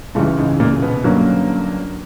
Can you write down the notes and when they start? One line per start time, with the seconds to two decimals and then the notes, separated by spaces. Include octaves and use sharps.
0.15 C#2 G2 C#3 E3 G3
0.37 G#2 G#3
0.60 A#2 A#3
0.82 B2 B3
1.04 G2 D3 F#3 A#3 C#4